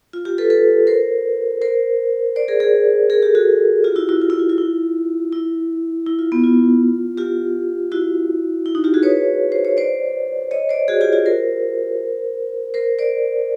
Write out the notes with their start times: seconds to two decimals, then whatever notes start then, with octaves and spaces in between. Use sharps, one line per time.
0.13 F4
0.25 F4 G4
0.38 A4 B4
0.50 A4 B4
0.87 A#4 C5
1.62 A#4 C5
2.36 C5 D5
2.48 G#4 A#4
2.60 G#4 A#4
3.10 G#4 A#4
3.22 G4 A4
3.35 F#4 G#4
3.84 F4 G4
3.96 E4 F#4
4.09 E4 F#4
4.21 F4
4.30 E4
4.39 F4
4.50 F4
4.58 E4
5.33 E4
6.07 E4
6.19 F4
6.32 B3
6.44 F4
7.18 F4 G4
7.92 E4 F#4
8.66 E4
8.75 D#4
8.84 F4 G4
8.94 F#4 G#4
9.03 B4 C#5
9.52 C5
9.65 C#5
9.77 C5 D5
10.51 C#5 D#5
10.69 C5 D5
10.88 F#4 G#4
11.01 F4 G4
11.13 F4 G4
11.26 A#4 C5
12.74 A#4 C5
12.99 C5 D5